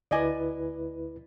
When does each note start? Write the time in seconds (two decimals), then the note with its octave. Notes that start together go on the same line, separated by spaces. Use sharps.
0.11 D2 E4 B4 D5 D#5 G#5